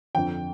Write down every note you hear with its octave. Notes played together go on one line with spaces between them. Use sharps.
F2 D3 F3 G5